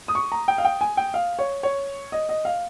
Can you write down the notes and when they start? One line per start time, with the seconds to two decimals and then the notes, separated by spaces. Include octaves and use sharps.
0.08 D#6
0.15 C#6
0.32 A#5
0.48 G5
0.58 F5
0.65 G5
0.81 G#5
0.97 G5
1.14 F5
1.39 C#5
1.63 C#5
2.12 D#5
2.29 D#5
2.45 F5